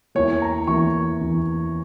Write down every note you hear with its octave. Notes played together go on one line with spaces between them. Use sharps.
E2 E3 A#3 C#5
A#5
E2 E3 A#3 C#6
E2 E3 A#3